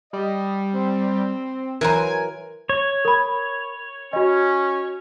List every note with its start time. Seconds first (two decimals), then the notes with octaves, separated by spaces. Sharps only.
0.13 G3 D#5
0.74 C4
1.81 E3 F#3 A#4 C5 G#5 A#5
2.69 C#5
3.05 A#4 B5
4.13 C#4 F#4 D#5